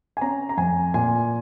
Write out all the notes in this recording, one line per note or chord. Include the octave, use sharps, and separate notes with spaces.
G#5
C#4 A#5
A#5
F2 G#5
A#2 G#5